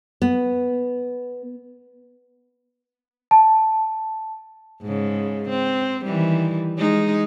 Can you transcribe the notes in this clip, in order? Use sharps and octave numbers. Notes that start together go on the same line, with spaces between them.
B3
A5
G#2 C#3
C4
D#3 E3 G3
G#3 D#4